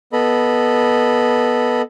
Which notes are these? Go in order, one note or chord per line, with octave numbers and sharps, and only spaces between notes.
B3 A4 D#5 B5